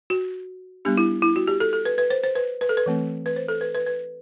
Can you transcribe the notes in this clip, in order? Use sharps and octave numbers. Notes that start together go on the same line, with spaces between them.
F#4
G3 B3 D4 G4
E4
E4
F#4
G4
A4
A4
B4
B4
C5
C5
B4
B4
A4
B4
E3 A3 C4
B4
C5
A4
B4
B4
B4